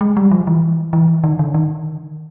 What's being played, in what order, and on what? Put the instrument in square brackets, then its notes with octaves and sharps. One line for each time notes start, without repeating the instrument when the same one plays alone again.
[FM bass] G#3
G3
F3
E3
E3
D#3
D3
D#3